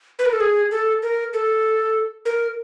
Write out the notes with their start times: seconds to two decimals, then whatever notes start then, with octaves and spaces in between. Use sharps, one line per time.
0.19 B4
0.26 A#4
0.33 A4
0.40 G#4
0.71 A4
1.03 A#4
1.33 A4
2.25 A#4